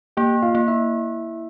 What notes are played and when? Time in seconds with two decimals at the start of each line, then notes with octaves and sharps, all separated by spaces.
0.17 A#3 G4 G5
0.43 F4 F5
0.55 A#3
0.68 E4 E5